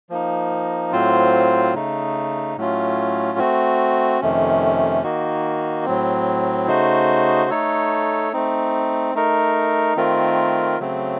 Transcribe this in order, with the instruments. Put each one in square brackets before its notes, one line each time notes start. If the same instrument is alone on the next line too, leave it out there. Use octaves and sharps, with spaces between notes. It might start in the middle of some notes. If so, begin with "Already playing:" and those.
[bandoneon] F3 A#3 D#4
A2 F#3 C4 F4 C5
C#3 A3 D#4
A2 F#3 A3 C#4 F4
A3 C4 F#4
F2 C3 D#3 A3 C#4
D#3 A#3 D#4 F#4
A2 F#3 C4
C#3 A3 D#4 F#4 C5
A3 D#4 A4 C#5
A3 C4 D#4
A3 D#4 A#4
D#3 A3 C4 F4 A#4
C#3 F#3 A3 C4